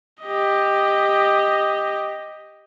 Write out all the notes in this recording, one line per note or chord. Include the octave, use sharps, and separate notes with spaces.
G4 D#5